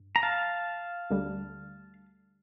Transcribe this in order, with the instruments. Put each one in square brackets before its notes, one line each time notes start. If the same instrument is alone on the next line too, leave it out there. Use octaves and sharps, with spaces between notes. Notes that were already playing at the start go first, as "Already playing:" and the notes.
Already playing: [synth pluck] G2
[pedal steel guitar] A#5
F5 A5
[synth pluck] D2 D3 G3